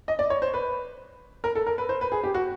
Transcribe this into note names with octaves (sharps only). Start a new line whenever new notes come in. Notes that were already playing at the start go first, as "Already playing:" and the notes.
D#5
D5
C#5
C5
B4
A#4
A4
A#4
B4
C5
B4
G#4
G4
F#4